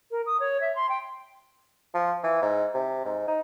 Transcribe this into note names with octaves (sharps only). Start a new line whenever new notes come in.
A#4
D#6
C#5
E5
C6
G5
F3
E3
G#2
C3
G#2
D#4